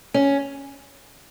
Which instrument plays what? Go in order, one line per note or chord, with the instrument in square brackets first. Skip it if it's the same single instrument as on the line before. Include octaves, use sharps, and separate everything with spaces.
[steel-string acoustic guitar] C#4